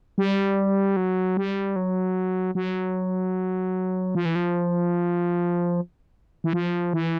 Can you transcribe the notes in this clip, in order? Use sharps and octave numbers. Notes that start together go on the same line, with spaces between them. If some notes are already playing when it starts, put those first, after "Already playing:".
G3
F#3
G3
F#3
F#3
F3
E3
F3
E3
F3
E3